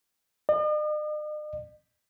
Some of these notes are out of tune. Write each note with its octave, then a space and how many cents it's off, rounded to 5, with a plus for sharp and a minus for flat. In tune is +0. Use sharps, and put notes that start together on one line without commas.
D#5 -45